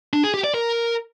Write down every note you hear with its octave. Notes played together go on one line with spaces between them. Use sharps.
D4
G#4
G4
D5
A#4